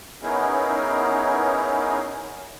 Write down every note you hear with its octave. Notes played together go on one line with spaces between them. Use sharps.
B3 C#4 D#4 E4 G#4 A#4